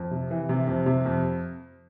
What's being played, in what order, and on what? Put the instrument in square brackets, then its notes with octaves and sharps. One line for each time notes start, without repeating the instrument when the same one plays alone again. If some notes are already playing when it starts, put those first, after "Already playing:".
Already playing: [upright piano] F2
C3
E3
C3
F2
C3
F2